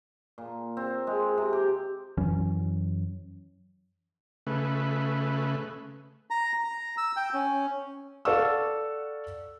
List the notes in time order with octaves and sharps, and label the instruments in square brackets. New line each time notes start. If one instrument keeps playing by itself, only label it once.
[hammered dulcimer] A#2
C4
G#3
C3
G4
[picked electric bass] F#2 E3 F#3 C#4
[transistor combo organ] C#3 A3 B4
[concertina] A#5
A#5
E6
G5
C#4
[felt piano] A4 D5 F5 F#5 C#6 E6